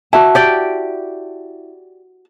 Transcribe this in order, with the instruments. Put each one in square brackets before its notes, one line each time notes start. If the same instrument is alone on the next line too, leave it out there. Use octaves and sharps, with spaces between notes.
[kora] E4 [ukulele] F#4 A5
[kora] G4 D5 G5